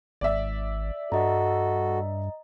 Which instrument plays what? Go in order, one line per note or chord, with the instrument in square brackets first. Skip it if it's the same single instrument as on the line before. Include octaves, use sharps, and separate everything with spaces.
[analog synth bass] G#1 [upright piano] D5 E5
[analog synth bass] G2 [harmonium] F#4 A4 [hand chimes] D#5 A#5